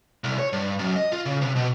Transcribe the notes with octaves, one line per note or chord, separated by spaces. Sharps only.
C2
C#5
G2
F#2
D#5
F4
C#3
C3
B2